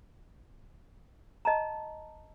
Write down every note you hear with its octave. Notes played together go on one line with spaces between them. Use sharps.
D#5 A5 A#5